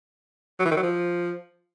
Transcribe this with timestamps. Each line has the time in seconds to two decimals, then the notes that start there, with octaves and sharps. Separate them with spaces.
0.60 F#3
0.65 E3
0.71 D#3
0.77 F#3
0.83 F3